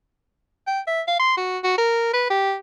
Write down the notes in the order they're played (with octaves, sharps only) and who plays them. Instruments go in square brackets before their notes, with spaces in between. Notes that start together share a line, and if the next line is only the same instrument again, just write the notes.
[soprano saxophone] G5
E5
F5
C6
F#4
F#4
A#4
B4
G4